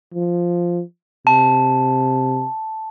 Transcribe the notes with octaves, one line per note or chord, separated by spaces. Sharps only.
F3
C3 A5